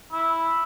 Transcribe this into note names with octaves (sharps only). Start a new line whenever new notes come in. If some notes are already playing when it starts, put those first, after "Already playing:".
E4